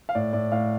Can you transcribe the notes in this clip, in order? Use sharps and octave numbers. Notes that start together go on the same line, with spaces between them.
F5
A2 D5
A2 D5
A2 F5